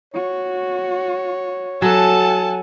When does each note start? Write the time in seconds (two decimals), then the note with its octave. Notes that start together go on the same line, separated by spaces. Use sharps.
0.14 F#4 C#5
1.82 F#3 A4 F#5 G#5 A5